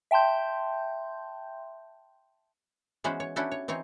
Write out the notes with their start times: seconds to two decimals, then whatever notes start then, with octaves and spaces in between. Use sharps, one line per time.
0.11 E5 G5 A5 C6 G6
3.04 E3 G#3 B3 C#4 F#4 C5
3.20 C#5
3.36 C#4 D4 E4 F#4 G4 A4
3.51 C#5
3.68 E3 C4 D#4 C#5